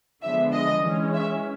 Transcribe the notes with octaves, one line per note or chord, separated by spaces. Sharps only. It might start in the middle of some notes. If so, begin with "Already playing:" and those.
D3 F3 G#3 B3 E5
D#5
E3 G#3 C#4
E5